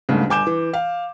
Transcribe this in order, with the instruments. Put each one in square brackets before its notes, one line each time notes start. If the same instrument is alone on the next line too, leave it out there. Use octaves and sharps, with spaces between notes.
[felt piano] G1 D2 G#2 C#3
G1 G#5 D6 G6 E7
E3
F5